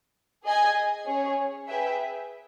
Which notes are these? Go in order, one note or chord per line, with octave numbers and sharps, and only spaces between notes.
G#4 D#5 G#5
C#4 G#4 C#5
G#4 B4 E5 G5